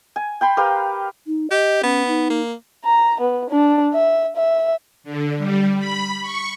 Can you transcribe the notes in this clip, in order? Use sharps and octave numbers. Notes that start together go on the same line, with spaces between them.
G#5
G5 B5 C6
G4 A#4 B4 F5
D#4
G4 D#5
B3 C#4
D#4
A#3
A#5
B3
D4
E5
E5
D3
G3
B5
C#6